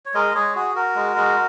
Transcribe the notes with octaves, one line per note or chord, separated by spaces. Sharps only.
C#5
G#3 A#4 D#5
G#3 G#4 C#5
F#4 G#4
F#4 A#4
G#3
G#3